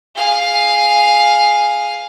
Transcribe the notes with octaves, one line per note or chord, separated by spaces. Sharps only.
G#4 F5